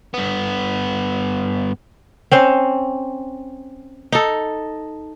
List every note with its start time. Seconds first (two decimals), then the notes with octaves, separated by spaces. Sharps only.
0.14 G2 B3
2.31 C4 C#4 C5
4.12 D#4 A4